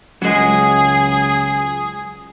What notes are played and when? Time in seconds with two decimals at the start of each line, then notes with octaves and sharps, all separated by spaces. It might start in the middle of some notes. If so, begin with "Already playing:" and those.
0.22 C#2 F#3 G#3 G#4